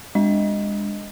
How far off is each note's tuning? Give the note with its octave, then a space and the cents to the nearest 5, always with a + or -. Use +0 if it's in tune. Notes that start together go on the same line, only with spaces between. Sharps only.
G#3 -25 D4 +0 D#5 +0